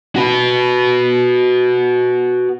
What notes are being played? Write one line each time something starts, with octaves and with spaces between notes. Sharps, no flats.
F#4 B4